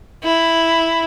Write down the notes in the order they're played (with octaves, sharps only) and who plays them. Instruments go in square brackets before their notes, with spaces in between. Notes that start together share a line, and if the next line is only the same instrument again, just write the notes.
[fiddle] E4